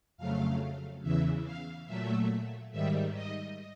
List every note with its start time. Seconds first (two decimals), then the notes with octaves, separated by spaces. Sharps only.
0.17 F2 C#3 F#3 A3 F5
1.02 E2 C#3 E3 E5
1.45 F5
1.87 A#2 F#3 A3 E5
2.72 G#2 D#3 G3 E5
3.14 D#5